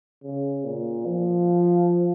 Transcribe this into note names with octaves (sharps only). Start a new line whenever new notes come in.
C#3
A#2
F3